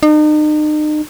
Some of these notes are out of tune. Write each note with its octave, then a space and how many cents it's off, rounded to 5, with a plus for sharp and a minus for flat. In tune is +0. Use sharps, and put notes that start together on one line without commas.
D#4 -40